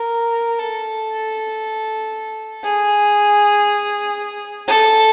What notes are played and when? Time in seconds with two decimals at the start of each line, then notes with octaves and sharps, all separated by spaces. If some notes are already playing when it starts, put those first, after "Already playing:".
Already playing: A#4
0.59 A4
2.64 G#4
4.68 A4